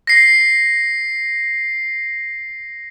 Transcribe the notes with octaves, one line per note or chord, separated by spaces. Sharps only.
A#6 C7